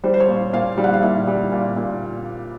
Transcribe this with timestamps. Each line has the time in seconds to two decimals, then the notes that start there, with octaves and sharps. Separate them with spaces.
0.04 G3 C5
0.14 C5
0.20 C#5
0.28 A#2
0.53 A#2 F5
0.78 G3
0.84 F#5
0.94 F5
1.02 A#2 E5
1.27 G3
1.52 A#2
1.77 A#2